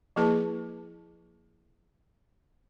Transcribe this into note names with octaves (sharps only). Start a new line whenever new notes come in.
F3 A#3 E4 G#4 B4 A5